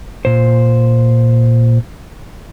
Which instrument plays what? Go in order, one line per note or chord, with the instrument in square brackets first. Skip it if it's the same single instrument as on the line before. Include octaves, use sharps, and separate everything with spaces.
[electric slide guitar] A#2 C5